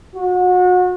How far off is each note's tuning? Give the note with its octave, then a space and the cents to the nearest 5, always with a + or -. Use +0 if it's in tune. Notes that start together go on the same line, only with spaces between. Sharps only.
F#4 -30